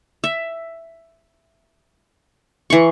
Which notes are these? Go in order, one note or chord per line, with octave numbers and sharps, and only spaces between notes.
E5
E3 C6 C#6